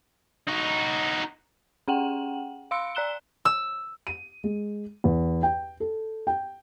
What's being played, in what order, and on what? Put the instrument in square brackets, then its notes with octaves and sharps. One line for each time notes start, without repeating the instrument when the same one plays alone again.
[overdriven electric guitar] D#4 F#4
[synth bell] C#4 G#4 F#5 G5 F#7
F5 C6 E6 C#7 D7
D5 A#5 F#6 E7 G7
[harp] E6
[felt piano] D#7
G#3
E2
G5
A4
G5